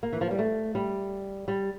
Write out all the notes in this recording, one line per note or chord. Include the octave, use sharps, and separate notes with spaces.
A#3
E3
F3
G3
A3
G3
G3